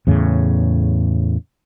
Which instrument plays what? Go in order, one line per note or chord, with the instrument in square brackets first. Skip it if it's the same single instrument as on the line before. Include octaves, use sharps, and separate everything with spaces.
[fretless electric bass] E2 A2 C#3